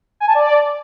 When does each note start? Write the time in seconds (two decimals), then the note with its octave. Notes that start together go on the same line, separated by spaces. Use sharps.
0.20 G#5
0.28 A5
0.35 D5